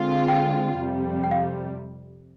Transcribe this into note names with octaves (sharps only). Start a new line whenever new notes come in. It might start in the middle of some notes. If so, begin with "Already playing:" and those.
Already playing: D3 G#3 C4 F4
G5
F2 C3 G3
G5
F5